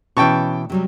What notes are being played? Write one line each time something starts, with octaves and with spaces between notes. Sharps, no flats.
B2 E3 C#4 G5 A5 C#6
C3 F#3 G3